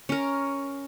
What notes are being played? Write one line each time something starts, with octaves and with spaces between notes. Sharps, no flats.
C#4 A#4